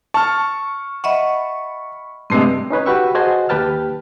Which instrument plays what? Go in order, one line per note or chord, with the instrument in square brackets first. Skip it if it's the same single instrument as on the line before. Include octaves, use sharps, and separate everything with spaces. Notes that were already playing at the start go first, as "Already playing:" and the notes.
[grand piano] A5 F6 [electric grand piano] C#6
[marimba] D#5 E5 F#5 [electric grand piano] B5 C#6
[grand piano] G2 C3 G#3 [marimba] A3 C4
[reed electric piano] C#4 D#4 B4 C#5
F#4 G4 B4 G5 C#6 E6
F#4 G#4 C5 D#5 G#5 A5
D#2 G4 B4 G5 A5 F6